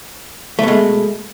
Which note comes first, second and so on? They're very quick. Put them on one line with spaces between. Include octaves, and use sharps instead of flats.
A3 B2 G#3